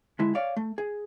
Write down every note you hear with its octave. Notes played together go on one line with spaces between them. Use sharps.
D3 G#3 E4
C#5 D5 F5
A3
G#4